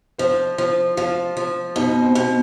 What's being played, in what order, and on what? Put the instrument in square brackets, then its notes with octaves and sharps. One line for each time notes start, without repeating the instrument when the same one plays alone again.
[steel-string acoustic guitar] F3 [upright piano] C5
[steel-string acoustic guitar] F3
[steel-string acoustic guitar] F3 [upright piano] F4
[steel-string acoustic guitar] F3
[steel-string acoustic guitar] B2 [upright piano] D#4
[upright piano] C4
[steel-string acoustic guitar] B2